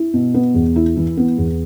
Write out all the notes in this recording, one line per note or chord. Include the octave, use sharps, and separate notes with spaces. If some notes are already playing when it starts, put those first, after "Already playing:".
Already playing: E4
B2
B3
E2
E4
E3
B3
E2